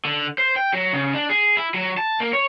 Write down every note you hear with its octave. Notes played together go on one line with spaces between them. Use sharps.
D3
C5
G5
F#3
C#3
D4
G#4
E4
F#3
A5
A#3
C#5